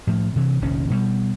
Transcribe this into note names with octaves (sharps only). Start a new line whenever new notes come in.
A2 F3
C3 E3
F1 A#1 D#3 C#4
B2 G3